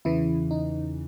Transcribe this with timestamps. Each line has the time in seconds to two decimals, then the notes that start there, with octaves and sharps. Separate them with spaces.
0.05 E2 C#3 E3 E4
0.51 D#4